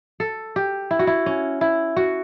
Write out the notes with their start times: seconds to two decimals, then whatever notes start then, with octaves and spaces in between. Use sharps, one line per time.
0.20 A4
0.56 G4
0.91 E4
0.99 F#4
1.07 E4
1.26 C#4
1.61 E4
1.96 F#4